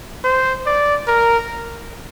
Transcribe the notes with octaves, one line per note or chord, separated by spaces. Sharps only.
C5
D5
A#4